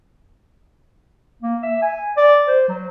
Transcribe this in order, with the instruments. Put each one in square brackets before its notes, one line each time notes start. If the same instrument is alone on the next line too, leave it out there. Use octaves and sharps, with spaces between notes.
[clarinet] A#3
E5
G#5
D5
C5
F#3